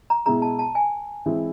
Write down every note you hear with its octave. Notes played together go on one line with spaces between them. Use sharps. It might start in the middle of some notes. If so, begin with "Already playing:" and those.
A#5
B2 G#3 B3 E4 G#4 A#5
A5
A5
G#5
E3 G#3 C4 E4